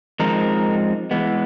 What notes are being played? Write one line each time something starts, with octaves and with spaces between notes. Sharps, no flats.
F3 G#3 C4 D#4 A#4
E3 G#3 B3